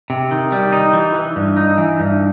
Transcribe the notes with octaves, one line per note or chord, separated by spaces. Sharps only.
C3
D#3
G3
D#4
E3
E3
G2
D#4
E3
G2